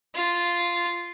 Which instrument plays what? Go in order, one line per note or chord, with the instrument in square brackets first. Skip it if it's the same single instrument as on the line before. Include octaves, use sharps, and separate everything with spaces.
[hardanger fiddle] F4